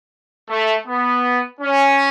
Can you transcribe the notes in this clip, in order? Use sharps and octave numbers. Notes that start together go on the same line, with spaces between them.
A3
B3
C#4